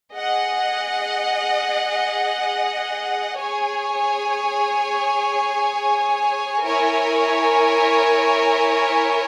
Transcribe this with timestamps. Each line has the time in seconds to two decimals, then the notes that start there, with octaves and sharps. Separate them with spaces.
0.13 G#4 D#5 F#5
3.37 G#4 C#5 G#5
6.63 E4 A#4 C#5 G#5